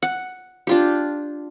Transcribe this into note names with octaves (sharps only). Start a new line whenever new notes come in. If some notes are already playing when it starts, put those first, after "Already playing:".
F#5
D4 F4 G4